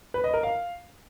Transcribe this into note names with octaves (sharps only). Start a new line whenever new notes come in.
B4
D#5
A#4
F5